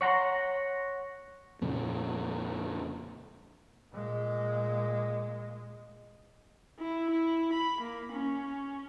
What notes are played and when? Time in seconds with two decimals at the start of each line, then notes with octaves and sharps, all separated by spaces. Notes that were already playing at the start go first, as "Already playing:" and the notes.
0.01 C#5 F#5 A#5 C6
1.61 F2 A#2 C#3
3.93 A#2 G#3
6.79 E4
7.10 E4
7.53 B5
7.81 A#3
8.12 C#4